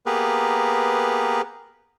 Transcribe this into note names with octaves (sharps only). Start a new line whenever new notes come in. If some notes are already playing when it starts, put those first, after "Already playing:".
A#3 B3 G4 G#4 A#4 B4